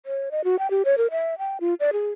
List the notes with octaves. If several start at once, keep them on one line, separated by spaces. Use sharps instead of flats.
C#5
D#5
F#4
G5
G4
C#5
A#4
E5
G5
F4
D5
G#4